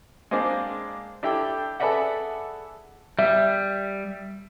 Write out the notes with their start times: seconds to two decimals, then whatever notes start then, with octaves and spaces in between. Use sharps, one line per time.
0.31 G#3 A#3 C4 D4
1.23 D4 E4 G4 A4 G5
1.80 G#4 A4 B4 D5 E5 F#5
3.19 G3 E5